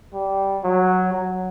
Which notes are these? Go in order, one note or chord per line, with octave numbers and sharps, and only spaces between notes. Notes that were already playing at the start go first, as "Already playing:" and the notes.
G3
F#3
F#3